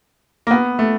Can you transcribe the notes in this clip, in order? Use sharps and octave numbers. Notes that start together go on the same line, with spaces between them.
A#3
B3
A3